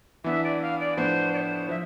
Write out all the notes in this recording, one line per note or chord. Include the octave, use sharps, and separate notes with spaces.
E3 B3 D4 E5
D5
F5
D5
A2 F3 B3 D4 C5
D5
C5
F3 E5